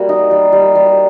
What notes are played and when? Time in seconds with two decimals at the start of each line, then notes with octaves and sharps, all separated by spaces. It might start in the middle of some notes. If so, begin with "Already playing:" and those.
Already playing: G3 A#3 F#4
0.09 D#4
0.31 G3
0.53 G3
0.75 G3